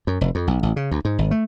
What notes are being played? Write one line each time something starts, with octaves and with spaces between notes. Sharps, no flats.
F#2
F1
F2
B1
A1
C#3
D2
G#2
G#1
A3